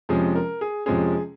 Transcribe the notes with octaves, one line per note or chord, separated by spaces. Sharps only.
F2 C3 F3 G#3 C#4 G#4
A#4
G#4
F2 C3 F3 G#3 C#4 G#4